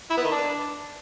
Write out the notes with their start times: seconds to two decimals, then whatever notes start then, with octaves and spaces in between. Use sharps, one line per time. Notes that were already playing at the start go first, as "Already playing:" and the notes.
0.11 E4
0.17 B3
0.24 D#3
0.31 D4